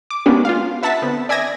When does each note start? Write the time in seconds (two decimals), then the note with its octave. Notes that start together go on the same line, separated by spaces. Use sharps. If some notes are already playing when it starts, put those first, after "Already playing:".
0.10 D6
0.26 G#3 A#3 B3 C#4 D4 G4
0.45 F4 F5
0.83 B4 E5 F#5 A5 A6 B6
1.02 D3 B3 C4
1.29 D5 E5 G#5 D#6 G#6 A#6